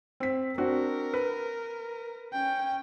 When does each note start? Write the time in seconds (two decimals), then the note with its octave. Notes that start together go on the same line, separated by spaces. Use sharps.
0.20 C4 B6
0.58 C4 D4 F#4 A#4
1.14 B4
2.33 C#4 G5